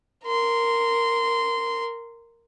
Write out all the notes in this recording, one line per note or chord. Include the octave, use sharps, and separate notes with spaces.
A#4 C6